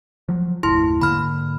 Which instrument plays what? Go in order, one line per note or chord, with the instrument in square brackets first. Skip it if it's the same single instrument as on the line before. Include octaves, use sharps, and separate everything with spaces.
[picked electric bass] F3 F#3
[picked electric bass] F#1 D#2 A2 [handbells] E4 C6
[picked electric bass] G#2 D3 A#3 [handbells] B5 F6